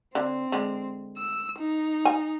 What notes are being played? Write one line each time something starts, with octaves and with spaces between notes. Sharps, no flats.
D3 C4
D3 G#3
E6
D#4
G#5